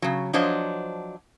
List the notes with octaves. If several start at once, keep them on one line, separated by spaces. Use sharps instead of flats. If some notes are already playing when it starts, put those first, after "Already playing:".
C#3 F#3
F3 F#3 D4 C5 C#5 D#5